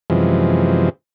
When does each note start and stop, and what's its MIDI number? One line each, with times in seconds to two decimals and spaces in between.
0.10 0.89 42
0.10 0.89 48
0.10 0.89 52
0.10 0.89 53
0.10 0.89 56